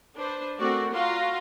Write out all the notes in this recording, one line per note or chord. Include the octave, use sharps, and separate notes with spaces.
D4 B4 C5
A3 C4 F#4 A#4 D5
F4 F#4 F5 A#5 C6